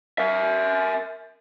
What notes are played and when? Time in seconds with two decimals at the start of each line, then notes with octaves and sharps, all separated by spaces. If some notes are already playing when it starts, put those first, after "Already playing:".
0.18 A#4 E5